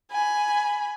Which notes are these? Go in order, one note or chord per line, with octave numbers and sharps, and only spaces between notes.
G#5 B5